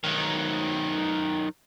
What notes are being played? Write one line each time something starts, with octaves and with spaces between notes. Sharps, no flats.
D#3 F#3